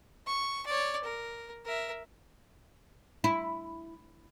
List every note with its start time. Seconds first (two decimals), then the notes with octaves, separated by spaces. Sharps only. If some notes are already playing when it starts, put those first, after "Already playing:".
0.27 C#6
0.66 C#5 D5
1.04 A#4
1.65 A#4 E5
3.24 E4